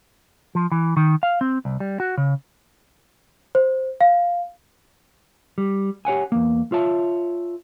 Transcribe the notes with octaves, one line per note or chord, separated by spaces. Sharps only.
F3
E3
D#3
F5
C4
C2
G3
F#4
C#3
C5
F5
G3
G4 C#5 F#5 G#5
E2 A#3
F4 C#5 E5 A5